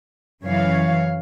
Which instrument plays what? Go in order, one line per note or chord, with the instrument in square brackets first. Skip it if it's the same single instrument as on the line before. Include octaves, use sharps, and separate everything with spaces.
[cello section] F#2 C#3 E3 C#5 F5